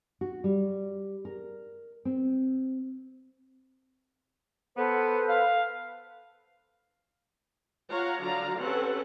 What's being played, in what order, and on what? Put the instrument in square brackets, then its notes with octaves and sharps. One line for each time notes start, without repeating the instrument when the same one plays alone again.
[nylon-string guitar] F#4
G3
A#4
C4
[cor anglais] B3 [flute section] A4 B4 C5
[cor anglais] F5
[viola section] F4 C#5 F5 F#5 A#5
D3 F#3 D5 F5 A#5
C4 C#4 G4 A4 B4 F#5